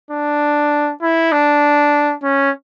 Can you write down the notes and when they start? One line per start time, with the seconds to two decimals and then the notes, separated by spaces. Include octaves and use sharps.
0.10 D4
1.02 E4
1.32 D4
2.23 C#4